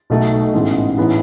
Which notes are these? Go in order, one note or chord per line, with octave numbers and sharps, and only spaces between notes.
B1 B2 A3 D#4
A1 G#2 E3 G#3 B3
A2 E3 B3 D#4